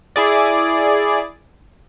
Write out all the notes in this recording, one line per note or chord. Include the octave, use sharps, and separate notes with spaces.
E4 G#4 D5